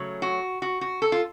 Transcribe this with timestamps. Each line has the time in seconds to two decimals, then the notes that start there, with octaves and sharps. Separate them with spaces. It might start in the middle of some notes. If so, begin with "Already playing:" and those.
Already playing: C#3 F#3 A3
0.22 F#4
0.62 F#4
0.81 F#4
1.02 A4
1.12 F4